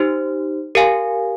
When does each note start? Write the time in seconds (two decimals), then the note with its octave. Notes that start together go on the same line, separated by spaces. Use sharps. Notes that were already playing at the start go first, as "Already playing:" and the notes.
Already playing: D#4 G4 C5
0.75 G4 A#4 F5 G#5